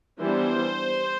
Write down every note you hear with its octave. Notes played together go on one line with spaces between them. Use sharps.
E3 G3 B3 D4 C5